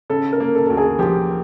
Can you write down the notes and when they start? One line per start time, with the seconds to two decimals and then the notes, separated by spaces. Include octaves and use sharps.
0.10 C#3 A4
0.33 A#4
0.40 A#3
0.55 A4
0.66 D2 A4
0.77 G#4
0.99 F3 G4